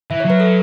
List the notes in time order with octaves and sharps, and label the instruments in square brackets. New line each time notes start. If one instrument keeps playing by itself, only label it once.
[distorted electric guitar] E3 [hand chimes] E5
[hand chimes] C#5
[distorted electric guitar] F#3 [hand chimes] B4
[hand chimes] A4